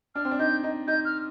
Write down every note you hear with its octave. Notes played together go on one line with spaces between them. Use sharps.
D4 F6
C4
D4
D#4 G6
D#4
D#4 G6
F6